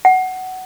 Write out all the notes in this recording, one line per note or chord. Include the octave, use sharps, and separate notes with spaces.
F#5